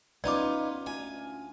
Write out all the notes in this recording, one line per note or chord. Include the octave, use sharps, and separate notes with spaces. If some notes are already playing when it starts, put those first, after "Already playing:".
B3 C#4 D#4 F4 D5 D6
D2 F4 G#5